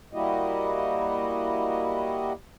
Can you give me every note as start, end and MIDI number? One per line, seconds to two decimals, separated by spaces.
0.13 2.32 55
0.13 2.32 58
0.13 2.32 64
0.13 2.32 66
0.13 2.32 67
0.13 2.32 75